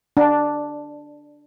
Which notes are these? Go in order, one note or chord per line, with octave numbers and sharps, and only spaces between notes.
D4